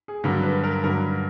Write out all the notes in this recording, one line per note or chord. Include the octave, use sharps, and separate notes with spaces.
G#4
G2 D3 F#3 A#4
B4
A#4
G2 D3 F#3 A#4